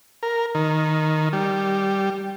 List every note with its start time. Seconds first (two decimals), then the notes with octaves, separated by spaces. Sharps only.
0.23 A#4
0.55 D#3
1.33 G3